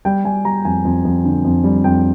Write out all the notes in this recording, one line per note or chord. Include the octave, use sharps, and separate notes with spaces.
G3 G5
G3 G#5
G3 A#5
F2 G#5
F2
F2
D3
F2
G3
F2 G5